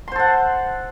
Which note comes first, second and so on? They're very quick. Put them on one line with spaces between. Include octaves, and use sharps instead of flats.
C6 C5 A4 F#5